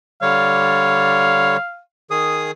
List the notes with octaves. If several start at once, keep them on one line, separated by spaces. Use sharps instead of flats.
D3 G3 C#5 F5
D#3 G#4 D#6